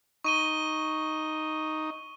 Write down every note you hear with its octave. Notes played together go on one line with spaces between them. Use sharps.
D#4 C#6 D#7 G7